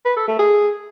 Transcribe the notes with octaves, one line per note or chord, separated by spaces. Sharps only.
B4
A4
A3
G#4